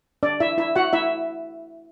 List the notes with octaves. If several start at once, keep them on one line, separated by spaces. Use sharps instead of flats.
D4 D5
E4 E5
E4 E5
F#4 F#5
E4 E5